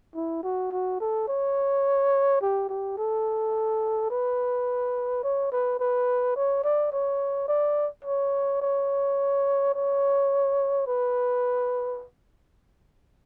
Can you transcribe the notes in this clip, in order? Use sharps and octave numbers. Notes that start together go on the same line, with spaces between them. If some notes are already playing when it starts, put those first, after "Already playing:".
E4
F#4
F#4
A4
C#5
G4
G4
A4
B4
C#5
B4
B4
C#5
D5
C#5
D5
C#5
C#5
C#5
B4